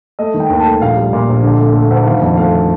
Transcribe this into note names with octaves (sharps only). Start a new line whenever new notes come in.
A3 D#5
D#3
G5
D#2
A5
A3
A#1 F5
G3
A#2
A#1
D3
A3
A3
D2
D#3 F5
F2
A3 F5